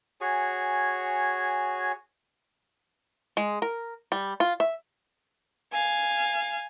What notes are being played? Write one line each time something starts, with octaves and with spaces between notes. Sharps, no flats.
F#4 G#4 C#5 G#5
G#3
A#4
G3
F4
E5
F5 G#5